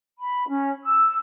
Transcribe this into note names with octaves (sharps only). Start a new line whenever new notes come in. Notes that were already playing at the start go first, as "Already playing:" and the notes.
B5
C#4
E6